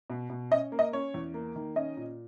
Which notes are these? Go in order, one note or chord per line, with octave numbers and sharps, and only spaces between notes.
B2
B2
C#4 D#5
A#3
D#5
C#4 C#5
E2
A#3
D#3
C#4 D#5
A#2